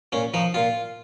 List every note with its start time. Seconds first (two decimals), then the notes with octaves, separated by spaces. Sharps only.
0.12 A#2 C#4
0.34 F3 D#4
0.54 A#2 F4